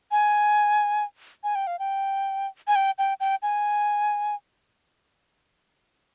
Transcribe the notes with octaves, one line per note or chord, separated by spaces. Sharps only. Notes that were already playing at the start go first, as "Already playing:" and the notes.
G#5
G#5
G5
F5
G5
G#5
G5
G5
G5
G#5